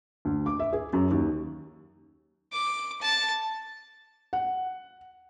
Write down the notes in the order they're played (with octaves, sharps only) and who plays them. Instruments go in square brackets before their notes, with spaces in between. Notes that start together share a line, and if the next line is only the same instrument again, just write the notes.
[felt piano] D2
D6
E5
G#4
F#2
D#2
[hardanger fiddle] D6
A5
[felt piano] F#5